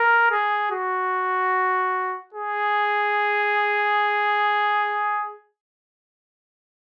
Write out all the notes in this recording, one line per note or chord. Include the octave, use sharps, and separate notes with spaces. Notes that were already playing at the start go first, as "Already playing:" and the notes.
Already playing: A#4
G#4
F#4
G#4